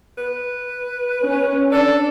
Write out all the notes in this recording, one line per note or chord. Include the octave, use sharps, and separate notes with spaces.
B4
C#4
D4 A4 D5